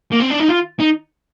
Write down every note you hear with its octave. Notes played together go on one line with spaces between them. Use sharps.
A#3
C4
D4
D#4
F4
D#4